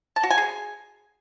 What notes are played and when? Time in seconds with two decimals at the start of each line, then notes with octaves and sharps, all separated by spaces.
0.16 A5
0.23 F#4
0.30 G#5
0.38 G#4